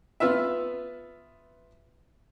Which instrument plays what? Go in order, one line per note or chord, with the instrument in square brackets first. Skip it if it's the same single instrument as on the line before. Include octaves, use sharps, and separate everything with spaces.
[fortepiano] B3 F4 B4 E5